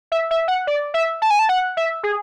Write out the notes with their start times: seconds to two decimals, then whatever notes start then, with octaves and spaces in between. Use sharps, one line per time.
0.12 E5
0.31 E5
0.48 F#5
0.67 D5
0.94 E5
1.22 A5
1.30 G#5
1.39 A5
1.49 F#5
1.77 E5
2.03 G#4